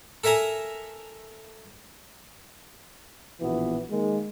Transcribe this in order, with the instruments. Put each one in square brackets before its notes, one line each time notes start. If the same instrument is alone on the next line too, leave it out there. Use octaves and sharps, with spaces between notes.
[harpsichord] A4 A#4 E5 G#5 A#5
[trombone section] A#1 B2 E3 B3
D#3 G#3 A#3